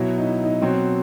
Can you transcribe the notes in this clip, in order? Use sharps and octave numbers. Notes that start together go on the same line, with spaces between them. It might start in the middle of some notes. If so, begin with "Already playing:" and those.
Already playing: B2 F#3 E4
D#4
E4
D#4
B2 F#3 C4